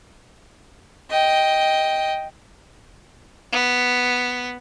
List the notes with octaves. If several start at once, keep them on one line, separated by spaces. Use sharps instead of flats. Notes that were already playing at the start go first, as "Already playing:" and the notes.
D#5 G5
B3